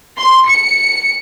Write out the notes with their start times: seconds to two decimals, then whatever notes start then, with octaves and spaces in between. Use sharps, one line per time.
0.17 C6
0.48 C#7